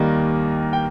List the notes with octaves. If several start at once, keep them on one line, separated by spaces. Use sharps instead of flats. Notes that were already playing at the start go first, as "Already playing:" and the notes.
Already playing: D#2 D#3 G3 A#3 D#5
G5